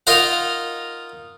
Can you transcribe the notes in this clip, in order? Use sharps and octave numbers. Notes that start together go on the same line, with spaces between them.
D#4 F4 A#4 F5 F#5